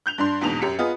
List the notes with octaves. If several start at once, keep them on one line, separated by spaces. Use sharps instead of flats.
F#6 G6 F7
G2 D4 C6
A#1 E2 G#2 B2 F7
F#2 G4 C#7
B3 F4 G#4 D#5